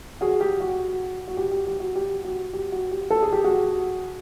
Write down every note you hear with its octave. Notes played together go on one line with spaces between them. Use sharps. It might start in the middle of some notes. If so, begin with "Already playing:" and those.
F#4 G#4
G4
F#4
F#4
G4
G4
G4
F#4
G4
F#4
G4
F#4
G4
A4
G#4
G4
F#4 G#4